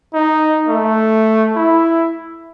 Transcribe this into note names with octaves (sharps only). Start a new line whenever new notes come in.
D#4
A3
E4